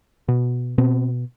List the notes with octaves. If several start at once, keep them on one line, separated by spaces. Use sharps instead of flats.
B2
B2 C4